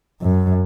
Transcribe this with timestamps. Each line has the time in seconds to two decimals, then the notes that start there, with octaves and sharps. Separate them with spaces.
0.21 F#2